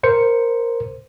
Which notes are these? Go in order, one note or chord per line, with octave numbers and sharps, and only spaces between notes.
A#4 C5 C#7